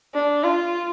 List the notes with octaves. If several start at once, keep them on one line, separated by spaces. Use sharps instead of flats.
D4
F4